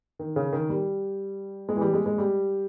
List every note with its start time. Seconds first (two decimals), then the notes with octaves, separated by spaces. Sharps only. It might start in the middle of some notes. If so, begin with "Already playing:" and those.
0.19 D#3
0.36 C#3
0.53 D#3
0.69 G3
1.69 G#3
1.76 E3
1.81 G3
1.93 G#3
2.06 G#3
2.18 G3